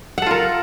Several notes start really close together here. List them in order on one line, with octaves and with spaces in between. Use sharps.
F#5 A4 F4 A#4